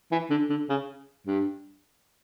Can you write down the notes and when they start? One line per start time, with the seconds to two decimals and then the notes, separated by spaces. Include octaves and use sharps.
0.11 E3
0.30 D3
0.50 D3
0.69 C#3
1.27 G2